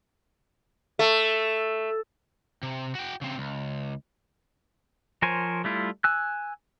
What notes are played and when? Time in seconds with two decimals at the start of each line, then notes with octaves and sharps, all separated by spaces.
0.99 A3
2.63 C3
2.95 F#4 G5
3.21 C#3 C4
3.38 C#2
5.22 F3 A#4 C5 C#5 G#5
5.64 G3 A3 E4 F4
6.04 G#5 E6 F#6